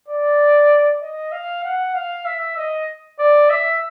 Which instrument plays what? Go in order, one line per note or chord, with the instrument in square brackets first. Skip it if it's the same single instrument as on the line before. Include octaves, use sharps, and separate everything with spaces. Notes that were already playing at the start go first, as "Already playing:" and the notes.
[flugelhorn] D5
D#5
F5
F#5
F5
E5
D#5
D5
E5